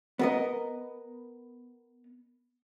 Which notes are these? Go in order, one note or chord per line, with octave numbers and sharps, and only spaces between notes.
B3 A#4 D#5